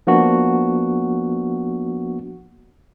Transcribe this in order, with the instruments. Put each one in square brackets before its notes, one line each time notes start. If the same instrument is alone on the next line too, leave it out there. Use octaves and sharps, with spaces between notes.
[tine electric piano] F3 A#3 B3 D4 F#4